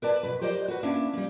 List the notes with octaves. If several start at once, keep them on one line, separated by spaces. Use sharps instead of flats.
A#4 B4 D5 A5
B2 B4
G4 A#4 C5 D5 D#5
F#4 B4
A#3 C#4 D4 E4
G3 A#3